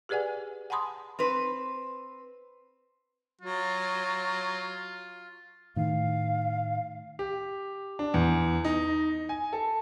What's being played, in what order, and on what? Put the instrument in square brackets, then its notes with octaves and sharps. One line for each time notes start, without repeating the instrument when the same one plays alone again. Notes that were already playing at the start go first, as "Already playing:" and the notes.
[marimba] G4 G#4 B4 D5 F#5 G#5
F#5 G#5 A5 B5 C6 D#6
[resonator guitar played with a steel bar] C4 B4
[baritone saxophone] F#3 [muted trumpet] F4
[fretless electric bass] A2 D#3 [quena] F5
[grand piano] G4
D4
E2
D#4
G#5
A4